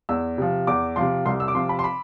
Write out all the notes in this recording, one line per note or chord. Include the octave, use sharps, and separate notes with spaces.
E2 E6
C3 F3
E2 D6
C3 F3 C6
C2 C6
E6
D6
C3 F3 C6
B5
C6
B5